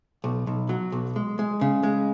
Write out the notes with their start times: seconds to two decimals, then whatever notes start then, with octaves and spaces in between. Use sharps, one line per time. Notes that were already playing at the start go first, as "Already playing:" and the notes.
0.24 B1
0.47 B1
0.69 F#3
0.92 B1
1.16 G#3
1.39 G#3
1.61 C#3
1.83 G#3